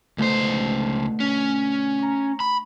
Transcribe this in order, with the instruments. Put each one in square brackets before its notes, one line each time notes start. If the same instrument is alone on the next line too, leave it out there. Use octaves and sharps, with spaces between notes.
[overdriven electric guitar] C#2 C5 [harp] B2 D3 A3
[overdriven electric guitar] C#4
[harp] A#5 C#6
[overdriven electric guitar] B5